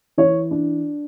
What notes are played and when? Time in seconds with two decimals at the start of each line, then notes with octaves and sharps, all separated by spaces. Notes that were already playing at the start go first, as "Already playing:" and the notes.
0.18 E3 C#5
0.51 D4